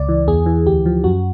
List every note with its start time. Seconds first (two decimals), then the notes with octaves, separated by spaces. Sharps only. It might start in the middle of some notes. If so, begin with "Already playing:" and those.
Already playing: C#2 D5
0.09 E3
0.27 E2 G#4
0.46 E3
0.66 D2 G4
0.86 F3
1.04 F#2 F#4